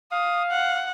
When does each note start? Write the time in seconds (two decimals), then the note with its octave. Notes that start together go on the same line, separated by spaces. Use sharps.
0.12 F5 D#6
0.51 F#5